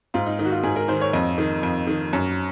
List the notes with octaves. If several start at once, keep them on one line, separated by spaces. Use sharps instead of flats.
G#2 F4
D#4
D#3 D#4
F#4
F4
G#2 G#4
A#4
D#3 C5
C#5
F2 D#5
D#3
F2
D#3
F#2